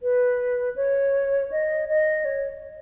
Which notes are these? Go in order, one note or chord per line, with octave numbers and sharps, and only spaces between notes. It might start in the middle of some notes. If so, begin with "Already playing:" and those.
B4
C#5
D#5
D#5
C#5